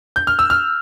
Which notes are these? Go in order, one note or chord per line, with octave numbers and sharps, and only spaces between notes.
G6
F6
E6
F6